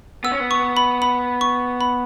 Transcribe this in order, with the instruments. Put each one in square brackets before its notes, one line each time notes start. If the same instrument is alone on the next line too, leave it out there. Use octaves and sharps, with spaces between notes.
[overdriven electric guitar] B3 [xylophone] E6
[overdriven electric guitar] C#4
B3
[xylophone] C#6
B5
B5
C#6
B5